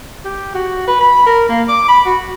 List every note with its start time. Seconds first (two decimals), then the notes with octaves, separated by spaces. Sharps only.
0.25 G4
0.55 F#4
0.87 B4
1.01 B5
1.26 A#4
1.49 A#3
1.68 D6
1.88 B5
2.06 F#4